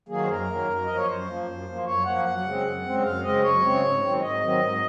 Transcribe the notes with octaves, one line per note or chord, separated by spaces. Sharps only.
D#3 F#3 A#3 G#4
C5
F#2 A#4
D#3 F#3 A#3
F#2
F3 A#3 D#5
C#5
F#2 C5
F3 A#3
F#2
F3 A#3
F#2 C#5
F3 A#3 F#5
F#2 F#5
C#3 G#3 C4
F#2
C#3 G#3 C4
F#2 F5
C#3 G#3 C4 D#5
F#2 C#5
C#3 G#3 C4
G#2
D#3 F#3 C4
G#2 D#5
D#3 F#3 C4
G#2